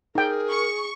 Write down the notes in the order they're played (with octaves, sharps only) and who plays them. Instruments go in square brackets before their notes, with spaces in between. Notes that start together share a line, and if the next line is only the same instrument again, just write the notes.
[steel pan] D#4 G5 [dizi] G#4 [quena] A#4
[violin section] C#6